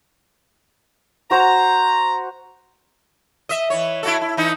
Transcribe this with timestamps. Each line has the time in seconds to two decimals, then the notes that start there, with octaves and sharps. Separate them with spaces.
1.31 F#4 C5 A#5
3.49 D#5 E5
3.70 E3 C#5
4.03 E4 F#4 A4
4.22 E4
4.37 E3 D#4 E4